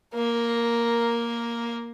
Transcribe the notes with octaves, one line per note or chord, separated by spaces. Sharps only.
A#3 A#4